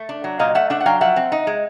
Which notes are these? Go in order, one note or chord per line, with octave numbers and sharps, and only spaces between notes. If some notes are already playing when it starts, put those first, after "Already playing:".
Already playing: A3
D4
F#3
A#2 D#5 F5
A3 E5 F#5
D4 E5 F#5
F#5
F#3 F5 G5
F3 E5 F#5
C4
D#4
G#3